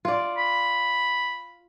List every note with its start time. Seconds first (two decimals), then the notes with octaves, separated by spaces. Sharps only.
0.05 F4 D5
0.38 B5